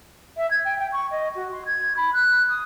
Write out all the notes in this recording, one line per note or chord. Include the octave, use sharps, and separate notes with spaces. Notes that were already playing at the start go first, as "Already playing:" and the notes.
E5
G#6
G5
G5
C#6
D#5
F#4
C6
G#6
B5
F#6
D#6